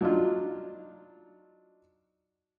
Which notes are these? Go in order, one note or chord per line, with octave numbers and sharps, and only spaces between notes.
F#3 D4 D#4 F4